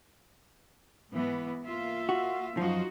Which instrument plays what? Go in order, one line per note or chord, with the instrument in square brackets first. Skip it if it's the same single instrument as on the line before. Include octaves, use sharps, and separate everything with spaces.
[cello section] G#2 E3 B3
A#3 F4 E5
[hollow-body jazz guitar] F#4
[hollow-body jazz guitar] F#2 F3 [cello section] D#4 F4 F#4